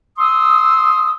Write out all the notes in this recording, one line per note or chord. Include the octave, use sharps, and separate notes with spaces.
C6 D#6 E6